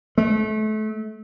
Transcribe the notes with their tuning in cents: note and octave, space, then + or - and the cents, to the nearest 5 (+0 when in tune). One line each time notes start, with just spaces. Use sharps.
A3 -30